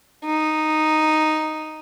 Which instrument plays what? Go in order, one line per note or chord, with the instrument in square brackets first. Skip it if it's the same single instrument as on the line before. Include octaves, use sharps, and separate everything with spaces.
[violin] D#4